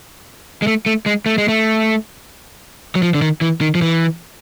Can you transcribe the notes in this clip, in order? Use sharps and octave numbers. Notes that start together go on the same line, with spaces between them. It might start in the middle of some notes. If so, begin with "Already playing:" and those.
G#3
A3
A3
G#3
A3
G#3
A3
F#3
F3
D3
D#3
E3
D#3
F3
E3